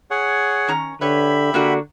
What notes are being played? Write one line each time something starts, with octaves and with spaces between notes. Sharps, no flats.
G#4 C#5 F#5
D#3 C#4 A#5
D3 G4 B4 C#5 E5 B5
D3 A#3 D4 F#4